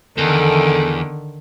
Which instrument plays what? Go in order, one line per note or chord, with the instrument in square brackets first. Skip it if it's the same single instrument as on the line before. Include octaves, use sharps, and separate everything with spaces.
[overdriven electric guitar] E2 [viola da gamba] D3 D#3 [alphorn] A4